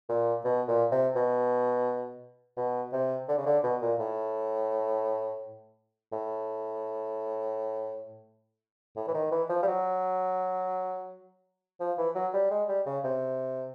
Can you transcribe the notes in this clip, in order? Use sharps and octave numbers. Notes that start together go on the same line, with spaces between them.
A#2
B2
A#2
C3
B2
B2
C3
D3
C#3
D3
B2
A#2
A2
A2
A2
E3
D#3
E3
F3
G3
F#3
F3
E3
F#3
G3
G#3
G3
C#3
C3